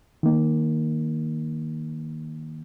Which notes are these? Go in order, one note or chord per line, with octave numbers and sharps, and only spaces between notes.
D#3 A#3